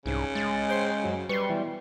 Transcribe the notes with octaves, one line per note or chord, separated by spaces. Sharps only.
C2 G#2 C#3
G#3 A6
C5 G5 C6 C7
F#2 F#3
G3 B4 C6 C#6
B2 E3